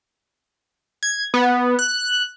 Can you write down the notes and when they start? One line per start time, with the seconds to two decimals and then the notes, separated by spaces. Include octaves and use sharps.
1.03 G#6
1.34 B3
1.79 F#6